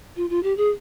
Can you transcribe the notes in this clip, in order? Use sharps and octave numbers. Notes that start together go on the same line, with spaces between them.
F4
F4
G4
G#4